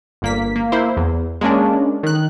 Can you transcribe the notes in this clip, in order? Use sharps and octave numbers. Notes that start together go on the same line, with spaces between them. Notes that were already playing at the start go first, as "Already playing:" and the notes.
G1 A#3 B6
A#3
A#3 E4 C5
E2
G#3 A#3 C#4 D4
D#3 F#6